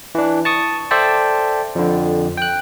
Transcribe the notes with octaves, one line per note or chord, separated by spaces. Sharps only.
E3 D4
A5 C#6 D#6
A4 C5 D5 E5 G5 A5
F2 D3
G5 F#6